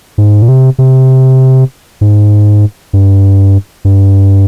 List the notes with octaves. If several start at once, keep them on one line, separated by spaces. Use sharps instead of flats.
G#2
A#2
C3
C3
G#2
G2
G2